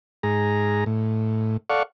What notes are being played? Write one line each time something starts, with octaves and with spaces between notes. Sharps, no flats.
G#2 G#4 A#5
A2
A4 D5 F5 F#5 C#6